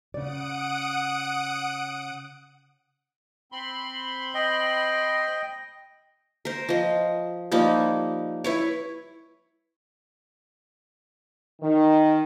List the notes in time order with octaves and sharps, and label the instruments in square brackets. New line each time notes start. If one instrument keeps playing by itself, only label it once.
[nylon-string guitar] C#3 D5 [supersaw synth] F#5 D#6 D7
[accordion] C4 B5 C6
[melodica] D#5 G5
[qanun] A#4 C5
F3 D#5
F3 G3 A#3 D#4
E4 B4 C#5
[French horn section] D#3